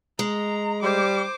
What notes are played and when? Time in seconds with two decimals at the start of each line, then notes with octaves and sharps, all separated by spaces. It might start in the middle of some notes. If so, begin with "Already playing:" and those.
0.19 G#3 A#5
0.83 G3 C5 D6